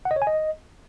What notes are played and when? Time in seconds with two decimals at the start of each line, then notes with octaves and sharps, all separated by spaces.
0.05 F#5
0.11 D#5
0.16 C#5
0.22 G#5
0.27 D#5